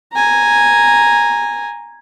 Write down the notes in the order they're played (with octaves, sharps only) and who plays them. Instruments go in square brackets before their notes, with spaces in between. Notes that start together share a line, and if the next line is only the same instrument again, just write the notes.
[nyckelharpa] G#5 A#5